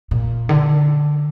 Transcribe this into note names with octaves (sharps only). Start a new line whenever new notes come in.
A#2
D3